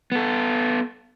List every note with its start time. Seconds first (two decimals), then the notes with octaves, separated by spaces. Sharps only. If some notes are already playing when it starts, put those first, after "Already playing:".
0.12 B3 A4